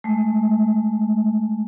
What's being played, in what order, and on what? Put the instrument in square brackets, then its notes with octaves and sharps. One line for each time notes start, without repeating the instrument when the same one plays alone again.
[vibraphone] G#3 A3